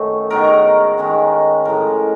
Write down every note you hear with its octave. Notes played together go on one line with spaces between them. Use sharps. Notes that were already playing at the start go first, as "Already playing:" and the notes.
Already playing: F#2 D#3 F#3 A3 C#4
G#2 D#3 F#3 B3 A#4
D#3 G#3 C#4
A2 F3 G#3 A#4